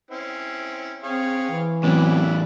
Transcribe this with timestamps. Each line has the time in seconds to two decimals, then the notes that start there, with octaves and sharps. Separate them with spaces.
0.11 C4 C#4 E4
1.04 C4 G#4 C#5 F5
1.50 E3
1.83 E2 A2 F#3 C4 C#4 E4 B4 D5